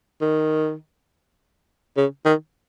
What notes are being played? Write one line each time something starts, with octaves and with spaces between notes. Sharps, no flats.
D#3
C#3
D#3